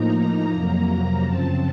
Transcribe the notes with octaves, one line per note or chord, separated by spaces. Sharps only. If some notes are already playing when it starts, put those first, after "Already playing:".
Already playing: A2 F3 A#3 D#4 A#5
F2 C3 F#3 A#3
F#2 C#3 F3 C4 A5